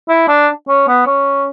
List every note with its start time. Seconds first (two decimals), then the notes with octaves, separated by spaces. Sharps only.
0.09 E4
0.28 D4
0.68 C#4
0.88 B3
1.06 C#4